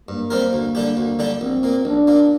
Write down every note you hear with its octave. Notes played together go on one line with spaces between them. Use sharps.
G2 A#3
G3 C4 G4 A#4
D2
D3 G3 D4 G4
D2
D3 G3 D4 G4
A#1 C4
A#2 A#3
A#1 D4
A#2 A#3